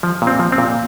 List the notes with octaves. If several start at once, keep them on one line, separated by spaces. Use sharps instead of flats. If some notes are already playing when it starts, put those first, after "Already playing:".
F3
A#2
C4
F3
C4
A#2